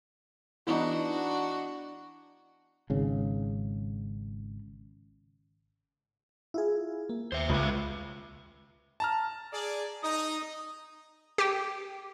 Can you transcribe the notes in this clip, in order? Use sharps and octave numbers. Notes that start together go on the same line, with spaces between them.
E3 B3 D4 D#4 F#4
G#1 C#3
E4 F4 G#4
A#3
D#2 C5 E5
C#2 C#3 F4 E5
A5 A#5 F6
G#4 D5
D#4 D#6
G4 G5